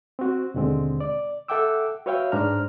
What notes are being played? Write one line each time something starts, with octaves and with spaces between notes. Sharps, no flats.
C4 F#4
D#2 B2 D3 G#3 C4
D5
A4 E5 F#5 G5 D6 E6
F#4 B4 C#5 E5 F5 G5
G#2 D4 C5 A#5 F6